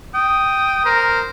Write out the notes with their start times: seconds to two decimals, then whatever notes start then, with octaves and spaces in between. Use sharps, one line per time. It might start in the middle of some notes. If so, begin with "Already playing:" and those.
0.14 G5 D#6
0.85 A#4 C5